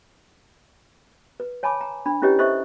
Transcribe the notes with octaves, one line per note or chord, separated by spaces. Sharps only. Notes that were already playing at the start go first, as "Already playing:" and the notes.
B4
C#5 G#5 A5 B5 D6
A#5
D4 B5
C#4 E4 G4 B4 C#5 D#5
A4 C5 D#5 E5 C#6